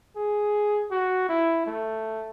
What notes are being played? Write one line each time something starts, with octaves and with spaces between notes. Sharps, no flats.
G#4
F#4
E4
A3